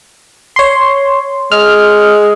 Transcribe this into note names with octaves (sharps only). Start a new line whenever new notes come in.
C#5 C6
G#3 F6